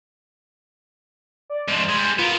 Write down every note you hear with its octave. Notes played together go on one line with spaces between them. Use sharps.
D5
G#2 F3
G3 G#3 C6
B3 F4 A#4